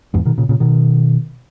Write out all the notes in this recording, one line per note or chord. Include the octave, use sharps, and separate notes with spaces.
E2 G#2
B2 D#3
A#2 C#3
A#2 C#3
B2 D#3